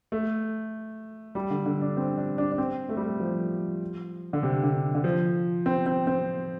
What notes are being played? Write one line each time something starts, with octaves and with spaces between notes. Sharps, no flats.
A3
G3
D3
D3
D4
C4
D4
D4
D4
C4
A3
G3
A3
F3
D3
C3
D3
D3
F3
C4
C4
C4